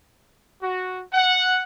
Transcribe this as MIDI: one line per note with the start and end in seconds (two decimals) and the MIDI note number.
0.62 1.02 66
1.14 1.60 78